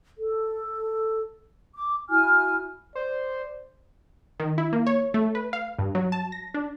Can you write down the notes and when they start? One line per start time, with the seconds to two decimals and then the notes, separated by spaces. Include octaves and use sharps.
0.19 A4
1.75 D6
2.09 E4 F#4 G#5 F6
2.95 C5 D5
4.40 D#3
4.58 E4
4.73 A#3
4.87 C#5
5.14 A3
5.35 B4
5.53 F5
5.79 G2
5.95 F#3
6.12 A5
6.32 A#6
6.54 D4